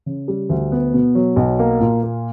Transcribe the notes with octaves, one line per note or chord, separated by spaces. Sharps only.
C#3
G3
D2
B3
B2
F#3
B1
A#3
A#2
A#3